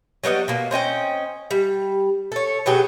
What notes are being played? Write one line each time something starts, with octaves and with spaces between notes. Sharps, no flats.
F#3 G3 B3 D#5
B2 A#3
C4 C#4 D#5 G5
G3
A4 C#5
B2 F#3 G4 G#4